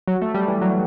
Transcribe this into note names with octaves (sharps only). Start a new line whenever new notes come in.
F#3
A3
G3
E3
F#3